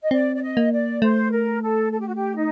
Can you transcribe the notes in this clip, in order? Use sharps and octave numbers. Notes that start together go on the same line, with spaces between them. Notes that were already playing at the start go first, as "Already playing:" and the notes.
D#5
C4 D5
D5
D#5
A#3
D5
A3 C5
A#4
A4
A4
G4
F#4
G4
D#4